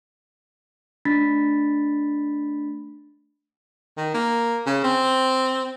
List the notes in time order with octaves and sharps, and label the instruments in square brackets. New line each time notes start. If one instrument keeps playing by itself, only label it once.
[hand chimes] A3 D4 B5 A6 B6
[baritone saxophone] D#3
A#3
C#3
C4